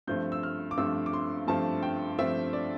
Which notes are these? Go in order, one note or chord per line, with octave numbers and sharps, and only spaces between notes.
G2 F3 A3 C4 G6
E6
F6
D6
G2 F3 A3 C4 E6
D6
C6
G2 F3 A3 C4 A5
G5
G2 F3 A3 C4 E5
D5